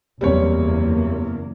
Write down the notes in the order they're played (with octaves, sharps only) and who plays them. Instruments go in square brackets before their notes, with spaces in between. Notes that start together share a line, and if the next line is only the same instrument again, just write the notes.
[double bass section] F#1 E2 A#3 [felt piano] G3 C4 C#5